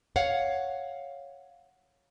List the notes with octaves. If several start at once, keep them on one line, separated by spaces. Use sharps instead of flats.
C#5 F5 F#5